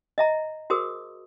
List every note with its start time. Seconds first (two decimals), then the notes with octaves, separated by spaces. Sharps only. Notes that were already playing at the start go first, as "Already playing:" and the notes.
0.18 D#5 E5 A#5
0.70 F#4 G#4 A#4 C5 D#6